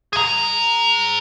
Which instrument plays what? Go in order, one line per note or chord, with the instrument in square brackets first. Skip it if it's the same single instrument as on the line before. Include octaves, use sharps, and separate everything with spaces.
[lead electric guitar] G#4 A#5